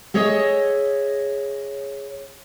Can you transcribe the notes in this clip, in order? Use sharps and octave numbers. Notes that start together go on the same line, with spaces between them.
G#4 C#5 D#5 E5